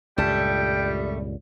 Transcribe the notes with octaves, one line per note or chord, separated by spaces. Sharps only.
C#2 G2 A#2 G3 A3 A4 G5